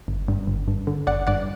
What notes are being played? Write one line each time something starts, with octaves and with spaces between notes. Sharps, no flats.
G1
G2
G1
G2
D3
G1 D5 F#5
G2 D5 F#5